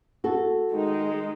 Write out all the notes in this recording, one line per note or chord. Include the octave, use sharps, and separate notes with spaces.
F#4 A4
D#3 G#3 D#4